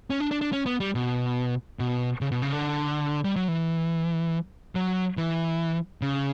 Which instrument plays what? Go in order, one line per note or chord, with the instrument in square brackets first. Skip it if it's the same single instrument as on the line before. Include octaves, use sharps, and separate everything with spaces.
[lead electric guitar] C#4
D4
D4
D4
C#4
B3
G3
B2
B2
C#3
B2
C#3
D3
G3
F#3
E3
F#3
E3
C#3